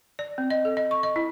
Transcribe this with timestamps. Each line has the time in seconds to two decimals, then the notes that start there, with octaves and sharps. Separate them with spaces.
0.19 D5
0.38 C4
0.50 D#5
0.65 A4
0.77 D#5
0.91 C#6
1.03 D#5
1.16 E4